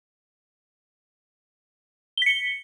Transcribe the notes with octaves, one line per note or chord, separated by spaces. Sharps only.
B6 C#7 G7